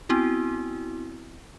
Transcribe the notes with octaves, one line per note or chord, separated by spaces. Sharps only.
B3 C4 E4 F#4